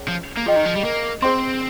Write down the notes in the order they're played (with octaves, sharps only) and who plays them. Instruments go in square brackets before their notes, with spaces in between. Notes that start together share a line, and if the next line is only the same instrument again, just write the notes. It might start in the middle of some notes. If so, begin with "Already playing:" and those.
Already playing: [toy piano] C#4 G#4 C#5
[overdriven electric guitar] F3
A#3
[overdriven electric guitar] F3 [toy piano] G#4 D#5 G5
[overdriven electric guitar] D#3
F3
G3
A#3
[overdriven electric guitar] C4 [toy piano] G#4 C5 G5 C6